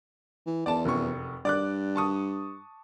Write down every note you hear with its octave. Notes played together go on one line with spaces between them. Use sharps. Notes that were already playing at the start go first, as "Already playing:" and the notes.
E3
E2 D5 A5
F1 F#2 C#6
G2 D5 D6 F#6
A5 C#6 D#6